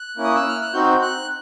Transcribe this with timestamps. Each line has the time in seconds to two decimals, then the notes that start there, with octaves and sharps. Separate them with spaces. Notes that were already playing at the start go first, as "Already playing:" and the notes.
Already playing: F#6
0.17 A#3 C#4 E4
0.24 D#6
0.36 E6
0.48 F6
0.61 F#6
0.73 C4 D#4 F#4 G6
1.02 F#6